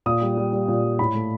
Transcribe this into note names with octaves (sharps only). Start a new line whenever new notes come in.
A#2 D#6
G3
G3
G3
A#2
G3
A2 B5
A3